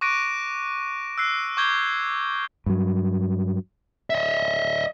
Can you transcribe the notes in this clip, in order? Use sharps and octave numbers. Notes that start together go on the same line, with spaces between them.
C#6 D6 F#6 A#6 D7 D#7
E6 F#6 C7
C#6 D6 G6 G#6 G7
G2 F#3
D#5 E5